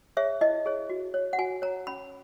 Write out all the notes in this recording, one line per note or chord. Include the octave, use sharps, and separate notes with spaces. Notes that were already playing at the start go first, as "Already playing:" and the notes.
G#4 C#5 E5
E4 D#5
G#4 C#5
F#4
C#5
F#5
F#4 G#5
C#5 A#5
C#4 B5